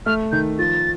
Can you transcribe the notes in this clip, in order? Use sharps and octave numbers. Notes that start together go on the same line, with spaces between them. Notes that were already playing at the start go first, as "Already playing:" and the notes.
A3 F6
D#3 G6
F3 A6